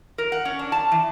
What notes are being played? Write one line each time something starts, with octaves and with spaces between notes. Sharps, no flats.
A#4
F#5
C#4
D4
A5
E3